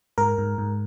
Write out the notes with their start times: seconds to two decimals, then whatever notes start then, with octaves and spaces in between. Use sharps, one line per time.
0.18 G#2 A#4
0.38 G#2
0.58 G#2